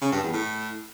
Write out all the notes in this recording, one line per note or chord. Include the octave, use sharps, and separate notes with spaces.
C#3
G2
E2
A2